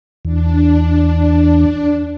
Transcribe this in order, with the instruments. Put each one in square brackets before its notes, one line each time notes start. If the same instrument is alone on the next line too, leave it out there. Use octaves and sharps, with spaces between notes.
[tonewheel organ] E2 [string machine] D4